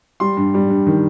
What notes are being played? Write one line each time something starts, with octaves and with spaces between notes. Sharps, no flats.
G3 C6
G2
G3
G2
D#3